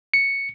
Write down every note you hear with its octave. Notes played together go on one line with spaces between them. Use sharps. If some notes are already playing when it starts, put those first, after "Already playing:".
C#7